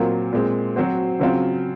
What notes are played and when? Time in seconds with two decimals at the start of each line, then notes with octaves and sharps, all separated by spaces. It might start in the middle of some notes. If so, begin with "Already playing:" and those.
Already playing: A#2 F#3 C4 F4 A#4
0.33 A#2 G#3 C4
0.76 F#3 C4 F#4 C5
1.20 C#3 F#3 C4 F4